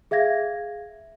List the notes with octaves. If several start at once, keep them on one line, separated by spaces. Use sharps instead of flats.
G#4 E5 F5 G#6 A#6